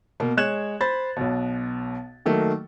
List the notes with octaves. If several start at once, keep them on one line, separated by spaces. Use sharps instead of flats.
B2 A#3
G#3 C#5 F#6 G#6 E7
C5 B5 A6
B1 B2
D#3 F#3 A3 A#3